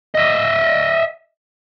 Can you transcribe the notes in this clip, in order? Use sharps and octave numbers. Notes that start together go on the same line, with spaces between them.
D#5 E5